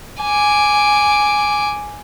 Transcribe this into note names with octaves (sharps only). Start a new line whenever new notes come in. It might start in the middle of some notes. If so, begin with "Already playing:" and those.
G#5 D6